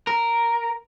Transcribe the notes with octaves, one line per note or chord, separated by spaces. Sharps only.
A#4